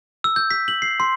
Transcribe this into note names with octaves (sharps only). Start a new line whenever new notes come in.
E6
G6
B6
F#7
C7
C6